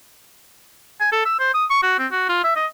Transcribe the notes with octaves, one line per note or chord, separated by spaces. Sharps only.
G#5
A4
E6
C5
D#6
C#6
F#4
C4
F#4
F4
E5
D#5